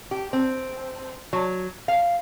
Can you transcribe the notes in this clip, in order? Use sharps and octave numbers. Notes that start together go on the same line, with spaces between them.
G4
C4
F#3
F5